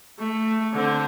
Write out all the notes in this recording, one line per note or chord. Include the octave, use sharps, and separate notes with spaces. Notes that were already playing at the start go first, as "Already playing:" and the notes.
A3
D3 C4